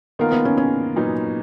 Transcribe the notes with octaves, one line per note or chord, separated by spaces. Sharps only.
D#3 A#3 B3 F4 A#4
B3
C#4
C#4
A#2 F#3 B3 D#4